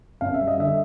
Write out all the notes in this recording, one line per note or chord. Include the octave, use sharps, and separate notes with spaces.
F#2 F5
E5
G3
D#5
D3 E5